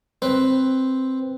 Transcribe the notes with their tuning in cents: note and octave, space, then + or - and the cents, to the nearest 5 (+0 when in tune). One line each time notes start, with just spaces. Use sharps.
C4 +0 B4 +0